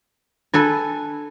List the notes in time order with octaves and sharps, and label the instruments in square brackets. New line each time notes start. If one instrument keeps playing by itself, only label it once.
[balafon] D4 [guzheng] A4 B4 G#5